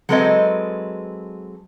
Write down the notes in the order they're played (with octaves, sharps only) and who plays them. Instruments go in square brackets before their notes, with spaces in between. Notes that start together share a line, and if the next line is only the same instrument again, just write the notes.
[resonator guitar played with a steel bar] F#3 G#3 C4 A4 B4 D#5